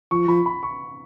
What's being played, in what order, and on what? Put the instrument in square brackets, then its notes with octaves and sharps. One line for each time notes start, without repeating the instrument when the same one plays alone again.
[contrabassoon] F3 [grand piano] C#6
[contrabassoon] F3 [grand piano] B5
[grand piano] B5
C#6